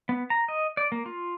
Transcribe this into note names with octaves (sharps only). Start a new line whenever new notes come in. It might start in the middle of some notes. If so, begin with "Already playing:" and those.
B3
A#5
D#5
D5
A#3
F4